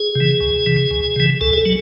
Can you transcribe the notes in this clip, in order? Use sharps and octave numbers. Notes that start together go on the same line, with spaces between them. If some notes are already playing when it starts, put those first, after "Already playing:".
Already playing: G#4
C3
E3
C#2
C3 E3
C#2
C3 E3
C#2 A4
G#4
A4
F#3